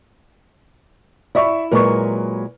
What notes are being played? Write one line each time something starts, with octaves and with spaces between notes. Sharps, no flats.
E4 D5 E5 C#6
A#2 F#3 G#3 A#4 B4 C#6